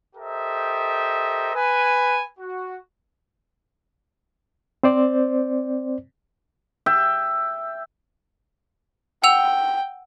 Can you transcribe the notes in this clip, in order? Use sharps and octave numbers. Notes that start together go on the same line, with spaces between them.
G4 A4 A#4 C5 D#5 E5
B4 G#5
F#4
C4 C5 D5
E5 G5
F#5 G5 E6 F7